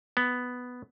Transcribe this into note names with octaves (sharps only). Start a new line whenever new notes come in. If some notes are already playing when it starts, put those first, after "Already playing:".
B3